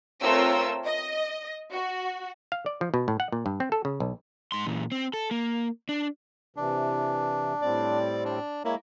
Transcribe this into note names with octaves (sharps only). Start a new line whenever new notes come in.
A3 C4 F4 A#4 C#5 E6
D#5
F#4
F5
D5
F3
B2
A2
F#5
A#2
G2
C4
A4
C#3
B1
G#2 C6
A#2 E3
C4
A4
A#3
D4
C3 E3 D4
A2 G3 C4 D5
D4
G#3 A#3 E4 C#5